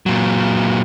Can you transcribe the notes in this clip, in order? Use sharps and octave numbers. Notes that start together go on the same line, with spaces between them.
A#2 F#3